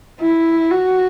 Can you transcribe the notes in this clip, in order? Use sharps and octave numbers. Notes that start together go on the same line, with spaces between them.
E4
F#4